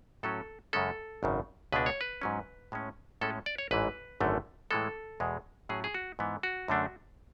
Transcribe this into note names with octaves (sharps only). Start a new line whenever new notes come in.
A2 F#3 C#4 A4
F#2 C#3 G#3 C#4 A4
G#1 F#2 C#3
C#2 B2 G#3 D4 B4
C#5
B4
G#2 F#3 C#4
A2 G#3 C#4
A2 G#3 C#4 A4
D5
C#5
A1 G#2 E3 B4
G#1 F#2 D3 A3
A2 E3 G#3 A4
E2 B2 G#3
A2 F#3 C#4 G#4
G#4
F#4
G#2 E3 B3
F#4
F#2 D3 A3 D4